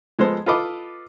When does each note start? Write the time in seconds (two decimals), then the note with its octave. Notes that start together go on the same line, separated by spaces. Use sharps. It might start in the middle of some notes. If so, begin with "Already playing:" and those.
0.19 F3 G#3 B3 A4 C5
0.46 F4 A4 B4 D#5 D6